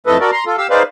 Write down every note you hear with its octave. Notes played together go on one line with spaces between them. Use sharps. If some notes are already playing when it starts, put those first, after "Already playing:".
F2 E3 A3 A4 B4 D#5
F#4 A4 A#4 D5
A#5 C6
F4 A4
G4 F5 E6
D#4 G#4 B4 C5 D5 F5